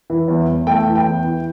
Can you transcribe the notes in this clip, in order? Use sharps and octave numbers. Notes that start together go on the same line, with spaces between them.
E3
E2
E2
A3 G5
E3
G5
E2
E3